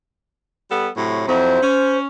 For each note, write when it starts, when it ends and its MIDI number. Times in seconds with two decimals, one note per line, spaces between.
0.70 0.87 55
0.70 0.87 59
0.70 0.87 69
0.96 1.26 45
0.96 1.26 48
0.96 1.26 54
1.28 1.60 41
1.28 1.60 54
1.28 1.60 64
1.28 1.98 72
1.61 2.07 61